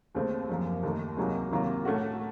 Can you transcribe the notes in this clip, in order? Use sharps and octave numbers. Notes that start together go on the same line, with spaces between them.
D#2 C#3 A3 C4
F#2 F3 A#3
D#2 D#3 A3
C#2 C3 F#3 A#3 D#4
C3 D#3 F#3 A#3 F4
A2 A3 C#4 F#4